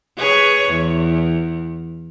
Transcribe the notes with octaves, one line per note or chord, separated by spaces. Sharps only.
G#4 B4 C#5
E2